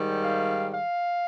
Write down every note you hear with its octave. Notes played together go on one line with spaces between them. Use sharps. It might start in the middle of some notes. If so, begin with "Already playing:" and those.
Already playing: G#2 D#3 G3
F5
F5